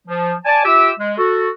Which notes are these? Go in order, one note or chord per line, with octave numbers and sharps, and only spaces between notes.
F3
D5 G#5 A5
F4 G4 E5 D6 E6
G#3
F#4 A4